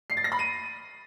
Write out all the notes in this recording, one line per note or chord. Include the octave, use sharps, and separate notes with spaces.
C7
A6
A#6
B5
D#7